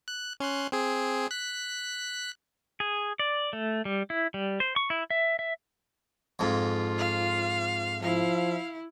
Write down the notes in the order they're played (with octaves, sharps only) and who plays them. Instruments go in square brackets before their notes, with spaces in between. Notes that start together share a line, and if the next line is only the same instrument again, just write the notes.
[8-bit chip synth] F#6
C#4 C6 F#6
C4 G#4
F#6 B6
[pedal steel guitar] G#4
D5
A3
G3
E4
G3
C5
C#6
E4
E5
E5
[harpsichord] F2 G#2 [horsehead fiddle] F4
[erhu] F5
[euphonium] F3 [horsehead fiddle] E4 [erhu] F5